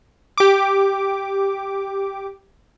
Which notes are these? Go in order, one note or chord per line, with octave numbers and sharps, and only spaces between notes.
G4 D6